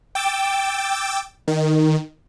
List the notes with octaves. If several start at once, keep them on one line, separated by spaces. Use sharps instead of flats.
G5 D6 E6 A6
D#3